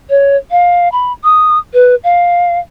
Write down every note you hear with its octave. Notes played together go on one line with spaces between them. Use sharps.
C#5
F5
B5
D#6
B4
F5